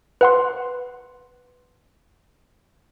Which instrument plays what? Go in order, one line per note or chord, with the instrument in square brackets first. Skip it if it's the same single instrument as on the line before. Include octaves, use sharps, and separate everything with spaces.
[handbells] B4 F#5 C6